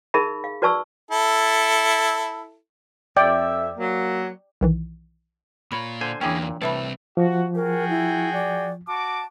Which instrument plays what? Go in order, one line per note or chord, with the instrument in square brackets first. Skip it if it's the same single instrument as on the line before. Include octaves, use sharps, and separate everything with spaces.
[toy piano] D#4 G#4 A#4 E5 B5
F5
F#4 B4 D5 A5 C#6 E6
[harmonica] E4 A4
[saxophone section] F2 E5 [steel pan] D5 G5
[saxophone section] F#3 A#3
[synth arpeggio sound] B1 D#3 E3
[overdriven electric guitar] A#2 F4 [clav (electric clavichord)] A#4 C#5 [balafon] B5
[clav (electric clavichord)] D3 C5 G#5
[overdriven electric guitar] E2 A#3 [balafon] E3 D4 G5 [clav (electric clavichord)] C#4 E4 G#4
[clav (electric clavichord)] A#2
[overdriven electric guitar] C2 C4 [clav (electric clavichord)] A2 A4 [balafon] B4 E5 B5
[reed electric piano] F3 [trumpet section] F#4
[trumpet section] F#4 G#4 G5 [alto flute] A#4
[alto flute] E4
D5
[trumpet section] F#4 D6 [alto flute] A5